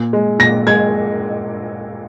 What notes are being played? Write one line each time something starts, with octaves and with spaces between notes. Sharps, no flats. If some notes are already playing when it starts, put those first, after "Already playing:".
Already playing: A#2
G#3
A#2 A#6
G#3 G#6